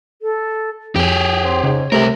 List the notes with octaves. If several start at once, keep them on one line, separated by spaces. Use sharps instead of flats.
A4
F2 G4 G#4 C#5
C4
G#2 C#3
C2 C3 A3 A#4